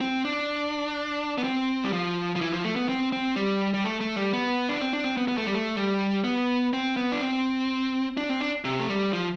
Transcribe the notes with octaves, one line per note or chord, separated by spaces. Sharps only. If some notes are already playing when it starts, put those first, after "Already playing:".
C4
D4
B3
C4
G3
F3
F3
E3
F3
A3
B3
C4
C4
G3
G3
A3
A3
G3
B3
D4
C4
D4
C4
B3
B3
A3
G3
A3
G3
B3
C4
B3
D4
C4
D4
C4
D4
C3
A3
G3
F3